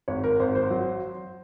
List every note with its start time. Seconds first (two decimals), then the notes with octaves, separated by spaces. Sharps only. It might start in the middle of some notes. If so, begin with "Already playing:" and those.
0.08 G#1 C#5
0.24 A#4
0.40 G#1 C5
0.55 C5
0.71 F#3